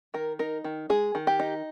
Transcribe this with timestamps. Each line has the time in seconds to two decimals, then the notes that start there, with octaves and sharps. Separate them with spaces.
0.14 D#3 A#4
0.39 D#4 A#4
0.64 D#3
0.90 G#3 G#4
1.15 D#3
1.27 G4
1.40 D#4